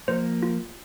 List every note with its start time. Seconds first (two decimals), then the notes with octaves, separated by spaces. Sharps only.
0.08 F3 A#3 C5
0.43 F4